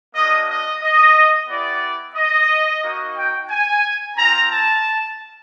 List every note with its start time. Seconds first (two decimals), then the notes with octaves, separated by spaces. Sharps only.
0.14 A#3 D4 F#4 D#5
0.48 D#5
0.81 D#5
1.48 B3 E4 G4 D5
2.16 D#5
2.83 A#3 D#4 F#4
3.16 G5
3.50 G#5
4.17 C4 F4 A#5
4.50 A5